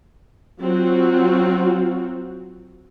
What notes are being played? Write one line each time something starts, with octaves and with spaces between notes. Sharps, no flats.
F#3 C4 F4 F#4